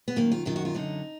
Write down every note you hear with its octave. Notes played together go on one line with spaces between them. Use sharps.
B3
F#2 D#3 A#3
F4
F#2 D#3 F4
F#4
F4
F#2 D3 D#4